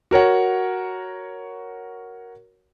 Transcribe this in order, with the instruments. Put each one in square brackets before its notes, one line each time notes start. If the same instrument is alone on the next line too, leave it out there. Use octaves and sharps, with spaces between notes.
[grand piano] F#4 A#4 C#5 F#5